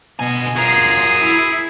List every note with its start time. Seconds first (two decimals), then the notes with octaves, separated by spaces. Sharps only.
0.19 B2 D3 D#5 G#5
0.56 F4 F#4 G#4 A#4
1.20 E4